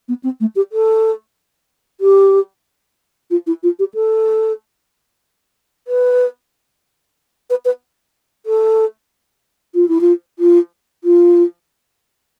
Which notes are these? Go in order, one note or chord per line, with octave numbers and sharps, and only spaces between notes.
B3
C4
A3
G4
A4
G4
F4
E4
F4
G4
A4
B4
B4
B4
A4
F4
E4
F4
F4
F4